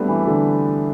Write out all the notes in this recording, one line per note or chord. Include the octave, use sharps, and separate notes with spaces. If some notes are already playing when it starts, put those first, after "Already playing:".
Already playing: G3 A3 B3 C4 D4 G4
E3
D3